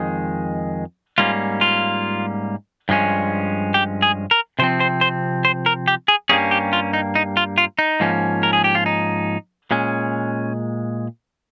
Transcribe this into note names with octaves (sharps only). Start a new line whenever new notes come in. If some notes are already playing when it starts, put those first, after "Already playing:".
Already playing: F2 D#3 G#3
G#2 G3 A#3 C#4 F4
F4
G2 F3 G#3 C#4
G4
G#4
A#4
C3 F3 C4 C5
C5
C5
C5
A#4
G4
G#4
G2 G3 A#3 C#4 G#4
G4
F4
D#4
D#4
F4
F4
D#4
G#2 F3 A#3 C#4
A#4
G#4
G4
F4
D#4
A#2 G#3 C#4